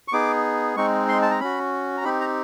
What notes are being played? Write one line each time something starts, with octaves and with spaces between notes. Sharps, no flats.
C#6
B3 D#4 G#4 D6
G#3 C4 D#4 C#6
C6
A5
A#5
C#4 F#4 B5
A#5
C4 D#4 G4 B5
A#5